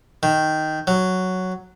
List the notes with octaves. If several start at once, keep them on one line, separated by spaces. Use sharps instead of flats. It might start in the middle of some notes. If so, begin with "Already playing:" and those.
D#3
F#3